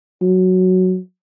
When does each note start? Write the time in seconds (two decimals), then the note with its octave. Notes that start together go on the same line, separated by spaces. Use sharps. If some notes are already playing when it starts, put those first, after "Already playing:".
0.22 F#3